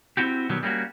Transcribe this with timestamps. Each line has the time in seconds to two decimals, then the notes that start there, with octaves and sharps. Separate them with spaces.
0.17 C4 E4 F#4 G4
0.49 B2 D#3 F#3 G3
0.63 G3 A#3 C#4 D#4 F#4